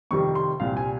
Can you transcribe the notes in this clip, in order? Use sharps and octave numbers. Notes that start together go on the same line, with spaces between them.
F2 C3 D#3 G3 C#6
C6
C2 A#2 G3 F5
G#5